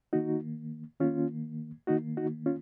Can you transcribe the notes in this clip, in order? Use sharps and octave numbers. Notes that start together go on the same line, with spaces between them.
D#3 A#3 D#4 F#4
D#3 A#3 C#4 F4
D#3 A#3 D#4 F#4
D#4 F#4
C#4 F4